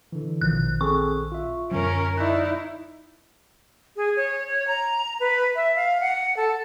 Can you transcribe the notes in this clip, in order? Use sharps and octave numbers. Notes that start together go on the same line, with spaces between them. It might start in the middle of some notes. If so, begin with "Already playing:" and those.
D3 E3
A#1 B2 D#3 F3 F#6
C4 G#4 A4 C#6
F4 E5
F#2 D3 F#3 C#4 A#4
D#4 E4 D5 E5 F#6
G#4
C#5
C#5
A#5
B4
E5
F5
F#5
A4